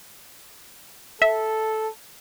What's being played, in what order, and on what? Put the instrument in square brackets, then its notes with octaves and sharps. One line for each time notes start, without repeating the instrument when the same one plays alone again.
[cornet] A4 [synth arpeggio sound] E5